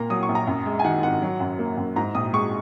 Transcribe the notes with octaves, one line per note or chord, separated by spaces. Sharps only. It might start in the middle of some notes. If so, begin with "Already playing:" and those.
Already playing: A#2 A#3 A#5
F#3 D#6
C#6
A#1
A#5
F#2
G#3
G#5
D#3 F#5
G#1 F#5
F#3
F#2
A#3
F#2
G#2 A#5
A#1 D#6
G#3 C#6